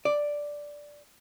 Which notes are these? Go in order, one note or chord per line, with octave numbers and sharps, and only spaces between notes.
D5